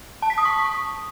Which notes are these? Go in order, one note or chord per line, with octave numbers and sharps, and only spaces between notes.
A5
B6
D#6
C#6